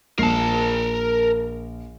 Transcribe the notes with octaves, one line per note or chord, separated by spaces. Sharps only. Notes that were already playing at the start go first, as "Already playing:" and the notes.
A#1 A#4 A5 C7